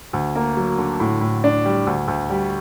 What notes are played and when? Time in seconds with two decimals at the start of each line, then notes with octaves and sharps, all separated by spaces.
0.13 D2
0.36 A#3
0.57 F#3
0.78 D3
1.00 A2
1.21 A2
1.44 D4
1.65 G3
1.87 D2
2.08 D2
2.30 G3